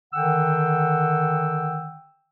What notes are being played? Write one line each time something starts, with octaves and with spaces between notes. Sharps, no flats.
D3 D#3 F#5 G5 E6